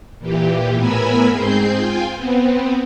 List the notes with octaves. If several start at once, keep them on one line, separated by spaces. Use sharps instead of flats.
A#2 E3 G4
A2 B3 A#4 G#5 B5 E6
G#2 C4 G#4 C6 G6
F4 G5 G#5
B3 C4